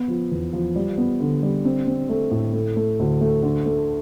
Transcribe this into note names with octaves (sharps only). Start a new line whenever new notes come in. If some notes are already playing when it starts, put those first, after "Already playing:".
Already playing: B3
F3
E2
F3
G3
B3
D3
G3
C4
C4
A3
A2
A3
A3
D2
A3
D3
A3